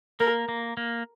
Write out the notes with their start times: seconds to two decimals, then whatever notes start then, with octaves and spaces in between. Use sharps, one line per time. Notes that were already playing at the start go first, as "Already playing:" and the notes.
0.20 A#3 A#4
0.49 A#3
0.77 A#3